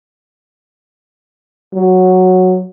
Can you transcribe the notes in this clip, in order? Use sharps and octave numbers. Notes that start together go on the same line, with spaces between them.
F#3